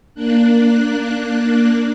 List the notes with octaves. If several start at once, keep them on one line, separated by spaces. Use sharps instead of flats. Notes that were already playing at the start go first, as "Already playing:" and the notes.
A#3 D4 F#6